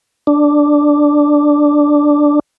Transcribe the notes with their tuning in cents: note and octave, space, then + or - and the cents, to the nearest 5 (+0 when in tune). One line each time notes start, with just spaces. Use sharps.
D4 +0